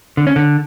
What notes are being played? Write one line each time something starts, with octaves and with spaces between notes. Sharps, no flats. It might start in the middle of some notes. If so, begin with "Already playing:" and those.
D3
C#4
D3